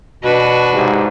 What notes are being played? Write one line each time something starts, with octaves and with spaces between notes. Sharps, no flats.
B2 D4 F#4 B4
G#2 C3